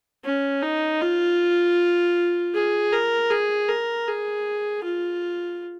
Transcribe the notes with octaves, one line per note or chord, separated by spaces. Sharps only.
C#4
D#4
F4
G#4
A#4
G#4
A#4
G#4
F4